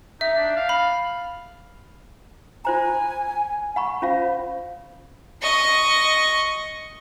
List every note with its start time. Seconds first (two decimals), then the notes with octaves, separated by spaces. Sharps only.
0.21 D#4 E5
0.36 D4
0.56 F5
0.69 B5
2.65 F4 C5 G#5 A#5
3.76 F#5 B5 C#6
4.02 C#4 F4 C5 F5
5.42 D#5 C#6